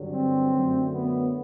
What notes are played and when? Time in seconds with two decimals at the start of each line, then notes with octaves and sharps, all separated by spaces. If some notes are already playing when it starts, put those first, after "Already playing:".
Already playing: G2 D3 F#3
0.10 C4
0.51 F#2 D3 F#3 A3
0.92 B3